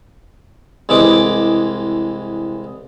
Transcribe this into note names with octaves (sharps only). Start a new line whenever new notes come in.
C2 E3 G#3 D6